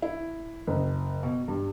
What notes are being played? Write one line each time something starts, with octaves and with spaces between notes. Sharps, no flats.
E4
F#1
B2
G2